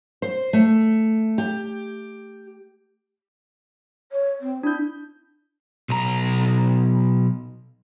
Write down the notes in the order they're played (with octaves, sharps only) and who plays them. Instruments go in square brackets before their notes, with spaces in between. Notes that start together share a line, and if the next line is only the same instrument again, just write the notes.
[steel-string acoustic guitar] C5
A3
G4
[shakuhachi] C#5
C4
[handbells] D4 G6 [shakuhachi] E4
[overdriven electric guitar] B1 A#5